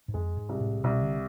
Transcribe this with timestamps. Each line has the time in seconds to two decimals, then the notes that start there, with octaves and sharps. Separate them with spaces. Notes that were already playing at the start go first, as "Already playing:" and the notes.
0.08 G#2
0.14 F2 G#3
0.37 G#2
0.49 C2
0.61 A2
0.84 C2 B2
1.01 D3